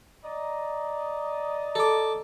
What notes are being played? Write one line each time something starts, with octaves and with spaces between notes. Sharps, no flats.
D5 D#5 A#5
A4 D6